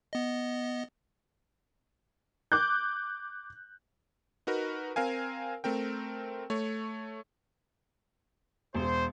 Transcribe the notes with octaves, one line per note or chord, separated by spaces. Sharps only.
B3 D#5
D6 F#6 G6
D#4 F#4 A#4 B4
C4 A#4 F5 G#5
A3 C4 A#4 G5
A3 C#5
E1 C5